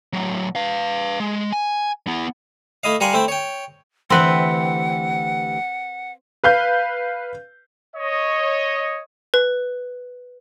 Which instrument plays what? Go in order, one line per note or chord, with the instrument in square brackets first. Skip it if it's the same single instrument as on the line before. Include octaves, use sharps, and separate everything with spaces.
[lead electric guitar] A2 F#3
B4 F5
G#3
G#5
B3 E4
[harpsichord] A3 E4 D#5 F5
G3 A#4 F5 F#5 G#5 C6
A3 C4 E4 G5
C#5 G5
[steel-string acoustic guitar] D2 E3 G4 [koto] C4 B4 [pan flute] F#5
[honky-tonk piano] B4 F5 G6
[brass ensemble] C#5 D#5
[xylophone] B4